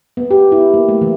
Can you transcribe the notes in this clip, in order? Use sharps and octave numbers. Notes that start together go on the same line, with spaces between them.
B3
G4
E4
A#3
A3
E3